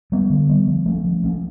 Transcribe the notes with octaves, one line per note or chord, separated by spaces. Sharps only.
G3 B3
D3
G3 B3
F3
A3 C#4
F3
A3 C#4